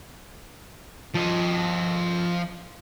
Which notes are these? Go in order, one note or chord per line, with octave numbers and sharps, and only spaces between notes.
F3 D#5